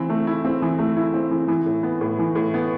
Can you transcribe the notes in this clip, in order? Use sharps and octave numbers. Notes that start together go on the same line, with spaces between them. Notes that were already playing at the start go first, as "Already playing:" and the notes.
Already playing: E3 C4 E4
A3
E4
C4
E3
A3
E4
C4
E3
E3
A2
B3
A2
E3
A2
B3